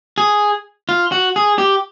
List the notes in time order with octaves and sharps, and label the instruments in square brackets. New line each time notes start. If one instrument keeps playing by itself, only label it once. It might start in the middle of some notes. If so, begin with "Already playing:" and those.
[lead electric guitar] G#4
F4
F#4
G#4
G4